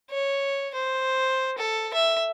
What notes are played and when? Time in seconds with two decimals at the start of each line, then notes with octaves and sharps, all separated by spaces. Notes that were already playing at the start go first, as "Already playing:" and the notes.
0.10 C#5
0.74 C5
1.58 A4
1.94 E5